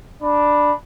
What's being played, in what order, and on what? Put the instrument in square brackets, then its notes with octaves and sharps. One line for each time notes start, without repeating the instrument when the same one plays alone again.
[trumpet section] D4 B5